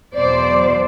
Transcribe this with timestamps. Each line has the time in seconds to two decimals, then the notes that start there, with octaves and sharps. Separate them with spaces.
0.15 E2 B2 F#3 C5 D5